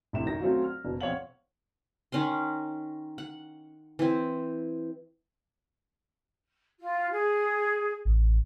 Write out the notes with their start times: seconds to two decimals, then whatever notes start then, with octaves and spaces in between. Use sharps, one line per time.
0.13 A1 D2 C3 E4 E5 E7
0.26 F#2 D#3 A#6
0.41 F#3 A3 C4 C#4 F4 F#4
0.64 F6
0.85 F#1 B2
1.01 E1 F2 C#5 F5 F#5 F#7
2.12 D#3 C#4 F#5 C6
3.18 F#5
3.99 E3 C4
6.80 F4
7.11 G#4
8.05 A1